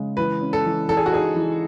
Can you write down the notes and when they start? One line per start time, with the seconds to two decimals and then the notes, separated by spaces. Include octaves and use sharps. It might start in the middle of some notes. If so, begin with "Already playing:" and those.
Already playing: C#3 G#3
0.17 E3 B4
0.41 C#4
0.53 A4
0.65 E3
0.88 E3 A4
0.97 G#4
1.06 F#4
1.12 D#4 G#4
1.35 E3